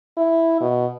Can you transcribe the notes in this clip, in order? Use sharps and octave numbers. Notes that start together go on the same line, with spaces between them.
E4
B2